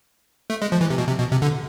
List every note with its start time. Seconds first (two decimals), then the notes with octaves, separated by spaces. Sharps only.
0.50 A3
0.62 G#3
0.72 F3
0.81 E3
0.90 C3
0.98 B2
1.08 C3
1.19 B2
1.31 C3
1.42 D3